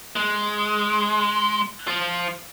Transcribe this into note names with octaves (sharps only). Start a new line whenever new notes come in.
G#3
F3 F4